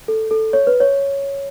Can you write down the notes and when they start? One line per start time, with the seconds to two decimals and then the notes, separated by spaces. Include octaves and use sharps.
0.08 A4
0.31 A4
0.53 C#5
0.67 B4
0.80 C#5